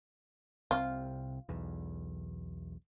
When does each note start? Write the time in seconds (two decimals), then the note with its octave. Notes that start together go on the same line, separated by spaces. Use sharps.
0.71 C2 C3 C4 F4
1.49 B1 E2